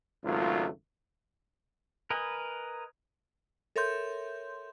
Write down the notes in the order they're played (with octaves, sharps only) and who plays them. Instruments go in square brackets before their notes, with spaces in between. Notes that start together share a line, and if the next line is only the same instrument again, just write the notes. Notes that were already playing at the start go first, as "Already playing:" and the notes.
[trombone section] G#1 C#2 F#3 A3 F4
[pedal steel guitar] A#4 B4 D#5 G#5
[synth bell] A4 A#4 C#5 E5 C6 G6